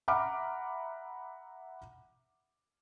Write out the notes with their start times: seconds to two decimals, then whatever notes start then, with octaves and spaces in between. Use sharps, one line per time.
0.08 E5 F#5 A#5 B5 D6 F6